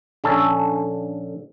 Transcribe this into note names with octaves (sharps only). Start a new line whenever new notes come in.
A#1 D3 C#4 A4